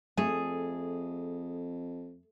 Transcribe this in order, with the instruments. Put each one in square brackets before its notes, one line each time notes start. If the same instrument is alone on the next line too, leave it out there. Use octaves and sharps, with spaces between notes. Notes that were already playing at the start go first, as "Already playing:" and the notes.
[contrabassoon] F2 [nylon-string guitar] A3 [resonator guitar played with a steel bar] G#4